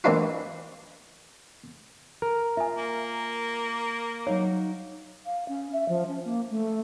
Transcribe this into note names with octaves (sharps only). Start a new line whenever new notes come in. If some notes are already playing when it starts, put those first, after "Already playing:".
E3 A#3 C4 D4 E4 F4
A#4
F4 E5 G#5
A#3
F#3 D#4 C#5 F5
F5
C#4
E5
F3
C#4
A#3
A3